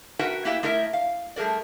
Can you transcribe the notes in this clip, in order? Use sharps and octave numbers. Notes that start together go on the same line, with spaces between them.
F#4 A#4 B4 E5 F#5 G5
A#3 B3 E4 G4 E5 G5
A3 E4 A#4 D#5 E5
F5
G3 A3 G#4 A#4 D5